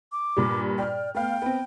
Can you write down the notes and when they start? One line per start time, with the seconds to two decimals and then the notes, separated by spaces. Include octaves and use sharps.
0.12 D6
0.37 G2 A#2 G3
0.78 D5 G5 F6
1.15 A3 B3 F5 G5
1.42 B3 C4